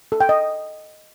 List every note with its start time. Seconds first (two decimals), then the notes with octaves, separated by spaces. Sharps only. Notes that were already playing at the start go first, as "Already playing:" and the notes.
0.12 A4
0.21 G5
0.29 D#5